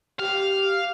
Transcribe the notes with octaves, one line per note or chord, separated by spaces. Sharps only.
G4 F5